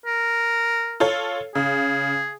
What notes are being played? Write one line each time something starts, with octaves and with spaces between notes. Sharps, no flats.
A#4
F4 A4 C#5
C#3 G#4